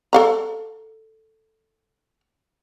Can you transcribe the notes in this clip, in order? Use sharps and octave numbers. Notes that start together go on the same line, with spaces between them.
A4 F5 A#5